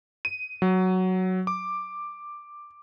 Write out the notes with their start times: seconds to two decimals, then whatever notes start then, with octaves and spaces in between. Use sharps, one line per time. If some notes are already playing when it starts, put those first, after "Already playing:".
0.25 D#7
0.62 F#3
1.47 D6